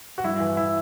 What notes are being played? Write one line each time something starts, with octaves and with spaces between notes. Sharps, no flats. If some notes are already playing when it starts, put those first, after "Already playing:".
F#4
G2 E4
E3
E4